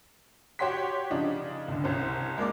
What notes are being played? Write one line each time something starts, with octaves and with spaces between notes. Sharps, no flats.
F#4 G4 C#5 F#5 C6 B6
C#3 F3 D4 D#4
C#2 D3
C2 C#4 C5
G#3 A#3 D5 D6